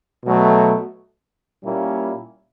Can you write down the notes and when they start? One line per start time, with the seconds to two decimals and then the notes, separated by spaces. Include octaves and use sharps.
0.25 B2 F#3 A3
1.64 A#2 G3 A#3 C#4 E4